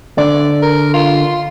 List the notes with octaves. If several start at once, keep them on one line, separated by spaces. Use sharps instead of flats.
D3 D5
A#4
F4